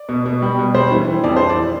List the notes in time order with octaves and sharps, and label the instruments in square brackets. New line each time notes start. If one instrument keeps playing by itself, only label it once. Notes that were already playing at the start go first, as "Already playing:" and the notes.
Already playing: [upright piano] D5
B2
B2
G3
B2
G3 C5
E3
E3
F2 D5
E3 C5
D5